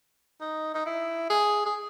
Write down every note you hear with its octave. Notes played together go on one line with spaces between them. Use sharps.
D#4
D#4
E4
G#4
G#4